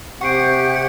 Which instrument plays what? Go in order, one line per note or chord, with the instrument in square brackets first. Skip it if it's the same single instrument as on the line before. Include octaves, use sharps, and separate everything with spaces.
[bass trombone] C3 [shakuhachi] G4 [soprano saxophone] F#5 [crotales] C#6 C7 D7